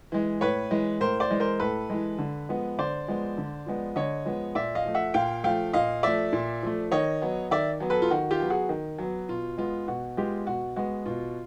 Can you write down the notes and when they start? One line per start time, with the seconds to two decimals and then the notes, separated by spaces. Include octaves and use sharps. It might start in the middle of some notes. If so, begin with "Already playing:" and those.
0.12 E3 G#3
0.41 A2 B4 C#5
0.71 E3 G#3
1.01 A2 A#4 C5
1.20 C5 D5
1.30 E3 G#3
1.40 A#4 C5
1.60 A2 A4 B4
1.90 E3 G#3
2.18 D3
2.49 F3 G#3 B3
2.79 D3 C5 D5
3.08 F3 G#3 B3
3.38 D3
3.66 F3 G#3 B3
3.96 D3 C#5 D#5
4.26 F3 G#3 B3
4.55 A#2 D5 E5
4.75 D#5 F5
4.85 F3 A3
4.95 E5 F#5
5.14 A#2 F5 G5
5.44 F3 A3 F5 G5
5.73 A#2 D#5 F5
6.03 F3 A3 D5 E5
6.33 A#2
6.63 F3 A3
6.92 D#3 C#5 D#5
7.22 F#3 B3
7.51 D#3 D5 E5
7.80 F#3 B3
7.90 A4 B4
8.02 F4
8.11 D#3 F#4
8.31 F4 G4
8.40 F#3 B3
8.50 F#4 G#4
8.69 D#3
8.99 F#3 B3
9.29 B2 F4
9.58 G#3 B3 F4
9.88 B2 F#4
10.17 G#3 B3 F4 G4
10.47 B2 F#4
10.76 G#3 B3 F#4
11.06 B2 F4